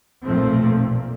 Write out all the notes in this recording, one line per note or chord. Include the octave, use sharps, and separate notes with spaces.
B1 F2 A#2 F3 A3 C4
A#2